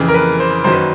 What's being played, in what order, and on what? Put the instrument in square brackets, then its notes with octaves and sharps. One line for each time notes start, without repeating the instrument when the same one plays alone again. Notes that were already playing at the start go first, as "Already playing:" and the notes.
Already playing: [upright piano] F2 C#3 E3
A#4
B4
C5
F#2 D#3 F#3 C5
B4